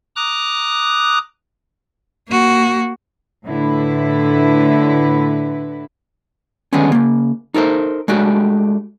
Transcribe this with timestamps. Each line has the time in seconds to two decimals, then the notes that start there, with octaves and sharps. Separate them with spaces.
0.16 A#5 D6 D#6 F#6
2.28 A#3 F#4
3.44 A2 D3 E4 B4
6.73 D3 D#3 G3 G#3 B3 C#4
6.92 C#3 A#3
7.54 D#4 A4 A#4 C5
8.08 G#3 A3 D4 F#4 G4